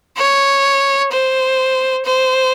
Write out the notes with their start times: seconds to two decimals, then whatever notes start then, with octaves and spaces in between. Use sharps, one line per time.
0.17 C#5
1.11 C5
2.05 C5